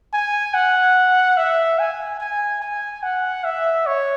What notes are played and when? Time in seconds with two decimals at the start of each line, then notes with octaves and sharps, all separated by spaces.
0.13 G#5
0.54 F#5
1.37 E5
1.79 G#5
2.20 G#5
2.61 G#5
3.03 F#5
3.44 E5
3.86 C#5